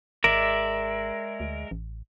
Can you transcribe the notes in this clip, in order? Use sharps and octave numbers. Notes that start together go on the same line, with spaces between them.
G#1 G#3 A#4 D5 E5
D2
A1